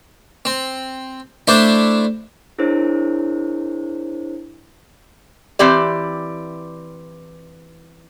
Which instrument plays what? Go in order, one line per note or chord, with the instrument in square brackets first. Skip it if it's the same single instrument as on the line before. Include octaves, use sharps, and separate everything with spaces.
[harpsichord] C4
A3 D4 E4 C5
[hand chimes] D4 E4 G#4 A#4 C5 C#5
[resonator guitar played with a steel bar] E3 C4 G4 D5